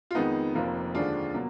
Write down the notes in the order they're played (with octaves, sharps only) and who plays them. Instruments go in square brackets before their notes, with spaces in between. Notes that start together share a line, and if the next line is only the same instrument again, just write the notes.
[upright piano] F4
F2 D#3 G#3 B3 D#4
F1 F2 F3 A#3
D#2 D3 F3 G#3 D4 F4
B2 F#3 A#3